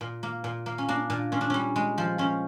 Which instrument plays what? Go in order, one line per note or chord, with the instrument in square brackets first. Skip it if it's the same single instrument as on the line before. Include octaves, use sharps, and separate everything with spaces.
[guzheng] A#2
A#3
A#2
A#3
C#4
A#3 D4
A#2
A#2 C#4
D4
G3 C#4
G#3
F3
F3 C#4